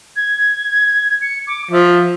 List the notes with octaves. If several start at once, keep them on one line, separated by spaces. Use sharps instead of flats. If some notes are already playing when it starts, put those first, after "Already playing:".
G#6
C#7
D6
F3 E5